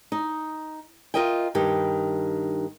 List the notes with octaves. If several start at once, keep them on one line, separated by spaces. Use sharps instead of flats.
D#4
F4 G#4 A#4 D#5 E5 G5
G2 D#3 G4